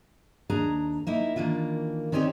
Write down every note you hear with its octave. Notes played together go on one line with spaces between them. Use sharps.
D#2 D4 G#4 A#5
A#3 D#4 E4
D#3 E3 A#3 D4 F4
D#3 C4 C#4 D#4 G4 D5